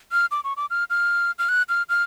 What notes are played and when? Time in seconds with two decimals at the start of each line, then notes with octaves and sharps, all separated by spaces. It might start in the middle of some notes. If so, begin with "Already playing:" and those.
0.12 F6
0.31 D6
0.44 C#6
0.57 D6
0.70 F6
0.90 F6
1.39 F6
1.49 F#6
1.69 F6
1.89 F6